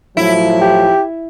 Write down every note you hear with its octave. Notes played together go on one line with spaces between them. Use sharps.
A2 F3 F#3 E4
G4